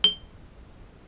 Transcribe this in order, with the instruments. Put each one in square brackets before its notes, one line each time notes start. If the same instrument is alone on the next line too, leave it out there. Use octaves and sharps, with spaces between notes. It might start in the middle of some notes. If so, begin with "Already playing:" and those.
[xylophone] G7